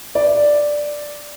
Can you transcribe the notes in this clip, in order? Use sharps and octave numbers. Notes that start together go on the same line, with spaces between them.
D5